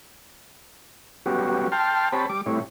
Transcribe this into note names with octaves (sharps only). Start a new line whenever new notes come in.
F#3 G3 B3 C#4 F#4 G4
G5 A5 C6 F6
C4 G4 C5 C#5 A5 B5
G3 D6
A2 G3 C4 E4 C#5